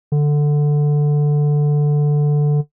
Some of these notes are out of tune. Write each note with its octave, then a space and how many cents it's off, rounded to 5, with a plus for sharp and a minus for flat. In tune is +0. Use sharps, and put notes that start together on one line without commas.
D3 +5